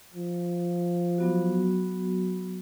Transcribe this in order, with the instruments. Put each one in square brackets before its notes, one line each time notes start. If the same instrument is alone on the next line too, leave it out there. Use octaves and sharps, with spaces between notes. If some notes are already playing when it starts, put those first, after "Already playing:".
[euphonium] F3
[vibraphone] F#3 B3 F#4